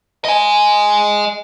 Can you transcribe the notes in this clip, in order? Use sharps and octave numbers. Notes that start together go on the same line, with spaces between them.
D#5 G#5